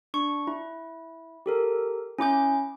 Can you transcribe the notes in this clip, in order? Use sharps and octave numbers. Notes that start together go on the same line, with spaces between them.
D4 C#6
E4
G4 A4 A#4
C#4 E4 D6 G6